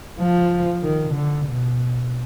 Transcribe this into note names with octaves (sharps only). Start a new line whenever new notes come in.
F3
D#3
D3
B2